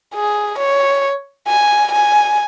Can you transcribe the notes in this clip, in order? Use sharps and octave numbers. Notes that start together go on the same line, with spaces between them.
G#4
C#5
G#5
G#5